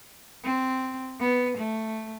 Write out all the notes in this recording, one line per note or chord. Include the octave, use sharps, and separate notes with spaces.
C4
B3
A3